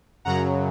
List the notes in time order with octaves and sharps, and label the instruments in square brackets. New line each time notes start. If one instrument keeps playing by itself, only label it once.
[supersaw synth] F#2 C#3 F#3 F#5 A#5